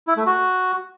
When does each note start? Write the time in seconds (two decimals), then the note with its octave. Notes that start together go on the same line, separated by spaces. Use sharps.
0.07 E4
0.17 A3
0.26 F#4